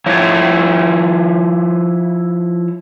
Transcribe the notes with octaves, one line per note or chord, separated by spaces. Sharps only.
F3 E4 C#5